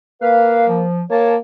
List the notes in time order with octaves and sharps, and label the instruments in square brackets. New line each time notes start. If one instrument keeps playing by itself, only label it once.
[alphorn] A#3 [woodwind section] B4 F5
[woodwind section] F3
[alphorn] A#3 [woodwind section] C#5 A5